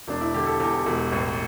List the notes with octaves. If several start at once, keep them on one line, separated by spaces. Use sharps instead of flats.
E1 D4
E4
D3 G4
A4
E2 G4
E1
A1